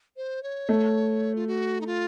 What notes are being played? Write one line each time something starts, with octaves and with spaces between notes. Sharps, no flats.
C5
C#5
A3
F4
F#4
D#4
F4